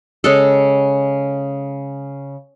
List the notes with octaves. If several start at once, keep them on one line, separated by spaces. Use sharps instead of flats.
C#3 G#3 A4